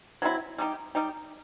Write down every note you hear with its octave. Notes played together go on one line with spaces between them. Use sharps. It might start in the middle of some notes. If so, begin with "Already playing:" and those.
F#3 C4 E4
G3 D#4 G4
G3 D#4 G4